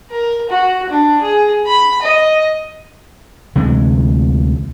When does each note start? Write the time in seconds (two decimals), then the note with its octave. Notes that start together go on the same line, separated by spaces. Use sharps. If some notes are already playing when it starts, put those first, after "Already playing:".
0.11 A#4
0.50 F#4
0.90 D4
1.22 G#4
1.66 B5
2.02 D#5
3.56 D2 C3 E3 G#3